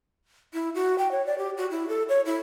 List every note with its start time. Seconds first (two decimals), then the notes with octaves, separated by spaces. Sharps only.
0.54 E4
0.75 F#4
0.98 G5
1.11 C#5
1.26 D5
1.38 G4
1.57 F#4
1.71 E4
1.89 A4
2.09 C#5
2.26 E4